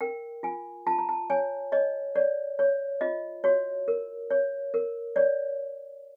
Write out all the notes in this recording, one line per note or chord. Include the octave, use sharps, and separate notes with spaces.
A#4 G5
F4 G#5
F4 A5
A#5
A5
C#5 G#5
C#5 D#5
C#5 D5
C#5
F4 D#5
F#4 C#5
A#4
C#5
A#4
C#5 D5